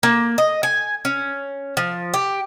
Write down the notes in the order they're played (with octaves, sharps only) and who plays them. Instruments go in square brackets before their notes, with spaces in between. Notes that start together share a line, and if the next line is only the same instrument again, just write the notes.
[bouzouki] A#3
D#5
G#5
C#4
F3
G4